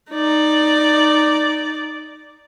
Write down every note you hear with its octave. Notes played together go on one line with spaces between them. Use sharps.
D#4 D5